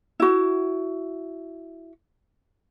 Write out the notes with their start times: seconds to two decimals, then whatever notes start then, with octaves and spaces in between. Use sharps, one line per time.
0.20 E4 F#4